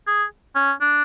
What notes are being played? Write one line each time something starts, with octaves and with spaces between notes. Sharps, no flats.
G#4
C#4
D4